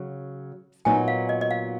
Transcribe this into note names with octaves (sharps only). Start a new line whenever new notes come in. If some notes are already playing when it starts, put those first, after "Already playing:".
Already playing: C#3 F#3
A#2 F#3 B3 D#4 G#5
F5
D#5
D#5
F5